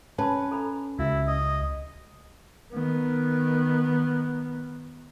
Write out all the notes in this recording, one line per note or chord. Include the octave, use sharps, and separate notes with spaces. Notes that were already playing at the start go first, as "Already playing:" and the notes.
C#4 B4 A5 C6
A4 A#5 B5
C#2 E4 F#4 E5
D#5
D#3 B3